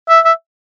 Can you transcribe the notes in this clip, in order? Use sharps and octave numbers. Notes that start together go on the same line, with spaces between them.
E5
E5